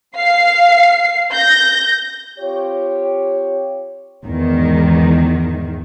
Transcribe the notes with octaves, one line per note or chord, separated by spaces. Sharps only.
F5 C7
G6 A#6
C4 F4 G4 C#5
E2 G#2 D#3